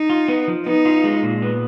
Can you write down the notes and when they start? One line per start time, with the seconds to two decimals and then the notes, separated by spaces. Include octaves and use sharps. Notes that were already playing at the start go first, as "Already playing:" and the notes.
Already playing: D#4
0.10 F4
0.28 B3
0.48 F3
0.66 B3 D#4
0.85 F4
1.04 G#3
1.23 A#2
1.42 B3